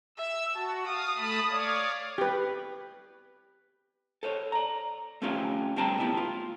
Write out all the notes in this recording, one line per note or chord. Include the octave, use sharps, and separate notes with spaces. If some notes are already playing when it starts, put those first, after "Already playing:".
E5 E6
F#4 A5
F5 D#6
A3 A5 B5
C#5 D5 F5
G4 B4
A4 C5 C#5
D5 A#5
A3 C4 C#4 F4 G4 F5
G2 B2 C4 G5 A5 A#5
A3 B3 E4 G4
F4